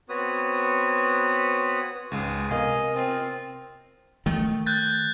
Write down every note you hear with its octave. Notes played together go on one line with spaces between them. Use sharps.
B3 C4 F#4 B4 C#5 D#6
C#2 G#2 G#4
C3 B3 A#4 D#5 F5 G#5
C4 F4
D#3 A3
F#6 G6 A6